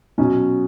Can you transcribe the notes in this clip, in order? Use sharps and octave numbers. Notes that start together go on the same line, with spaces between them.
B2 F#3 C#4